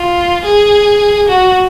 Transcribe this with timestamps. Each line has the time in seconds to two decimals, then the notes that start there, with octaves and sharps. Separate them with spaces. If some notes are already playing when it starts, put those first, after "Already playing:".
Already playing: F4
0.44 G#4
1.28 F#4